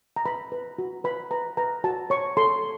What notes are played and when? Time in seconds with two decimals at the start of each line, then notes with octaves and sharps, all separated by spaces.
0.16 A#5
0.26 B4 B5
0.52 B4
0.78 F#4
1.04 B4 B5
1.31 B4 A#5
1.57 B4 A#5
1.84 F#4 A5
2.10 C#5 C#6
2.37 A4 C6